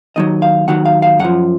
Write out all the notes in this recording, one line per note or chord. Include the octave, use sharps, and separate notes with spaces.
D#2 D#3 F#3 D#5
F5
D#2 D#3 F#3 F#5
F5
F5
F#2 F3 F#5